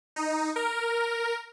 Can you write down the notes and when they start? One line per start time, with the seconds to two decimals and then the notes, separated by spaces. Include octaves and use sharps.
0.16 D#4
0.56 A#4